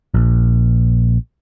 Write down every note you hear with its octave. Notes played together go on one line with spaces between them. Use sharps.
A#1